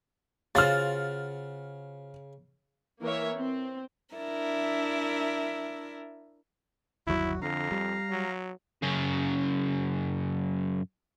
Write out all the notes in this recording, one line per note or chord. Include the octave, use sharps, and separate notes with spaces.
C#3 F4 F#4 C5 F#5 F6 A6
E3 A#3 A#4 C#5 E5
C4
D4 E4 A#4 E5
G1 D#2 F#3 E4 F#4
F2 D3 F5 A#5
G3
F#3
F#2 C#3